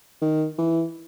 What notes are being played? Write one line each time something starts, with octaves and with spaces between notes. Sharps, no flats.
D#3
E3